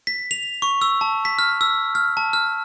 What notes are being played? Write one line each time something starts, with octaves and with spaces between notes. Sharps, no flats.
B6
F7
C#6
E6
A5
B6
F6
E6
F6
A5
F6